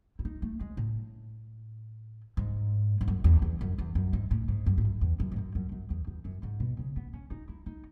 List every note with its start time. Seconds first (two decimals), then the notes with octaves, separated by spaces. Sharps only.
0.19 E4
0.25 D#4
0.42 A3
0.60 G#3
0.77 A2
2.37 G#2
3.01 G#2
3.08 F#2
3.24 E2
3.42 E2
3.61 F#2
3.78 E2
3.95 F#2
4.13 G#2
4.31 A2
4.48 G#2
4.66 F#2
4.78 G#2
4.84 F#2
5.01 E2
5.20 F#2
5.32 G#2
5.36 F#2
5.55 F#2
5.72 F#2
5.90 E2
6.07 E2
6.25 F#2
6.43 G#2
6.60 B2
6.79 C#3
6.96 B3
7.13 C#4
7.31 D#4
7.49 E4
7.66 D#4